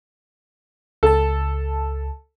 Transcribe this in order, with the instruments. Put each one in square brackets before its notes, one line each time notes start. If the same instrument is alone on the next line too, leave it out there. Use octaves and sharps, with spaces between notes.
[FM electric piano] C#2 A5 [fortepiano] A4